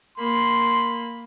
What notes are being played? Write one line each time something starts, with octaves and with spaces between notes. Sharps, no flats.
A#3 B5 C6